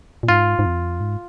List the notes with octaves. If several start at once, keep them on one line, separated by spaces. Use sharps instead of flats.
A#2
G#2 F4
G#2
F2
G#2